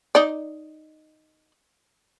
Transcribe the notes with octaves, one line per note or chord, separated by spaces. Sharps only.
D#4 D5